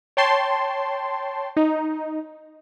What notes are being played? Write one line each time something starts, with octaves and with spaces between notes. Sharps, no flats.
C#5 G5 A5 C6
D#4